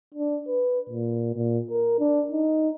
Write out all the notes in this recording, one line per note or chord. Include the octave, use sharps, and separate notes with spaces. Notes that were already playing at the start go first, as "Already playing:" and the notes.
D4
B4
A#2
A#2
A#4
D4
D#4